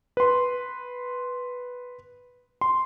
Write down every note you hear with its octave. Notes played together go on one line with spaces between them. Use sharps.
B4 C6
C6